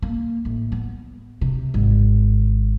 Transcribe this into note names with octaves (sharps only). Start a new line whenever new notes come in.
A#3
A1
B3
C3
G#1